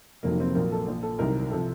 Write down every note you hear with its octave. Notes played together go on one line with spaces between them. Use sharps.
F1 F2 C3 D#3 F#3 A#3
C4
A#1 A#2 F#3 A#3
A4
A#1 A#2 F3
A4
C2 C3 D#3 F#3 A#4
C3 F3 A4